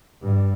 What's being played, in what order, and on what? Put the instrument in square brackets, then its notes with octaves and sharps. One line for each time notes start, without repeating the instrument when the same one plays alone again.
[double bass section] G2